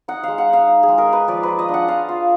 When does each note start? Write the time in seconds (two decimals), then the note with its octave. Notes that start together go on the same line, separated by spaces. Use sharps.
0.08 D#4 F#5
0.23 G#3 F5
0.38 F#5
0.48 D#4 F5
0.68 D#4
0.83 G#4
0.88 G#3
0.98 A#4
1.08 D#4 B4
1.28 F3 D5
1.43 F4 B4
1.59 D#5
1.68 D4
1.74 F#5
1.88 F4 F5
2.09 F4